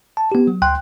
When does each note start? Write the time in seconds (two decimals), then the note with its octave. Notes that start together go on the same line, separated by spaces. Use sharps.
0.17 A5
0.32 B3 G4
0.47 F#3
0.62 D2 G5 C6 F#6